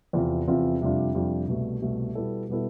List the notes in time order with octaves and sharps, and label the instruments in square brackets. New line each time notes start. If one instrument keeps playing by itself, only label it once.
[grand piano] E2 C3 F3 C4 F4
E2 C3 F3 C4 F4
F2 C3 G3 D4 F4
F2 C3 G3 D4 F4
C2 B2 A3
C2 B2 A3
B2 G3 B3 E4 A4
B2 G3 B3 E4 A4